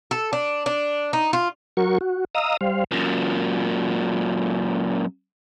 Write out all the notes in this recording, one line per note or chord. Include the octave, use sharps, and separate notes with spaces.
A4
D4
D4
D#4
F4
F#3 F#4 A#4 C#6
F#4
D#5 F5 A#5 D#6 E6
G3 C5 F5
F#2 A#2